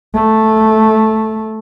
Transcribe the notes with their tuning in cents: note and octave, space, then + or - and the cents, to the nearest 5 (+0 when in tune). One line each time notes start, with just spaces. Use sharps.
A3 -5